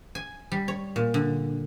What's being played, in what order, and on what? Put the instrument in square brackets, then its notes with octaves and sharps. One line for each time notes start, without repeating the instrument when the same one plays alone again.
[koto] G#5
G3
C#5
A#2
D3